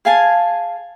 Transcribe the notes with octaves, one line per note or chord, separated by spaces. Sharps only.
G#4 F5 G#5 A5